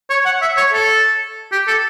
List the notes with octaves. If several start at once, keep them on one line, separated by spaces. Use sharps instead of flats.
C#5
F#5
E5
C#5
A4
G4
A4